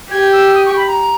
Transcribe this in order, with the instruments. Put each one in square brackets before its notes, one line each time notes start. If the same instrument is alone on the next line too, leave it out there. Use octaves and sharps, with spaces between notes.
[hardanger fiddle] G4 [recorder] G#6
[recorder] E6
D#6
C#6
B5
A#5